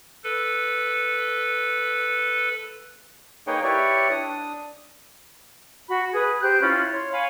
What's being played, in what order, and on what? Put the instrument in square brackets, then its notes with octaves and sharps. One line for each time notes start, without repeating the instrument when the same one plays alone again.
[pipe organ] A4 B4
[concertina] A#3 D#4 G#4 B4 C#5 G5
E4 G4 B4 C#5 D5 C#6
D4 D#6
[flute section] F#4 B5
G#4 B4 D#6
G4 C5 F#6 G6
C#4 E4 F4 B5
C#5 C6
C#5 F5 G#5 B5